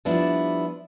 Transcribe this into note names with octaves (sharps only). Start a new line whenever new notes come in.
F3 G3 B3 D4 E4